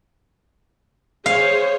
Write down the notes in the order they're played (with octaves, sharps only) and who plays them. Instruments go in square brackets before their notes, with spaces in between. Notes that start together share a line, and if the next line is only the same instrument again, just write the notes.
[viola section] G#4 C5 C#5 [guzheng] F5